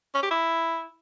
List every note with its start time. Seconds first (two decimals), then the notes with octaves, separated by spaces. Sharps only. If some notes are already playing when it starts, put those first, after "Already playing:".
0.15 C#4
0.23 G4
0.31 E4